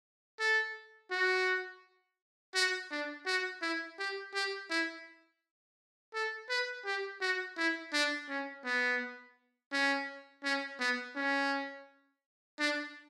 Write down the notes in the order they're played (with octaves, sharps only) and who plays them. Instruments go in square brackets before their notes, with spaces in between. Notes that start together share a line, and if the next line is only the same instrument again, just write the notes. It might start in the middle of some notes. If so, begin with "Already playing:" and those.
[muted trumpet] A4
F#4
F#4
D4
F#4
E4
G4
G4
E4
A4
B4
G4
F#4
E4
D4
C#4
B3
C#4
C#4
B3
C#4
D4